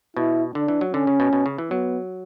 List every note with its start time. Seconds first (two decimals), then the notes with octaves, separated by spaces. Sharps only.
0.16 B2 E4
0.55 D3 D4
0.68 E3
0.81 F#3
0.94 D3 C#4
1.07 C#3
1.20 B2
1.33 B2
1.46 C#3
1.58 E3
1.70 F#3 B3